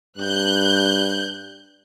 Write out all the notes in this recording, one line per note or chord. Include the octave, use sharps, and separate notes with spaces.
G2 F#6 G6